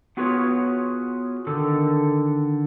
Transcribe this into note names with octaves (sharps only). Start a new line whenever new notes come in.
B3 F4 F#4 G#4 B4 C#5
D3 D#3 A4